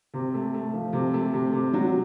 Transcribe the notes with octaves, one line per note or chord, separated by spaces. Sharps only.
C3
A3
A3
F3
C3
A3
C3
C3
F#3